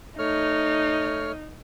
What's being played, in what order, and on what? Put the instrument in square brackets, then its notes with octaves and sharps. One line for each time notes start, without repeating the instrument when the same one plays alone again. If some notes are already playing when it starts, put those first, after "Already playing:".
[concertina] A3 C#5 F6 [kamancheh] D#4